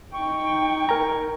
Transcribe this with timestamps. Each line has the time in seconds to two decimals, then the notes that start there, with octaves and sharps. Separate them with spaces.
0.13 D#4 G5 C#6
0.89 A#4 G#5 A#5